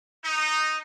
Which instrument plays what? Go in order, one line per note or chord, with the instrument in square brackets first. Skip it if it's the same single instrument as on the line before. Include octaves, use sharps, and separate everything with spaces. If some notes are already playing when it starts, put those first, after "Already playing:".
[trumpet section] D#4